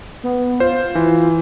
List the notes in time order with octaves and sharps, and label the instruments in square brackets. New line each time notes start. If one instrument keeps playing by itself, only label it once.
[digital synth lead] B3
[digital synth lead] F4 [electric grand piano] C5
[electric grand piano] E3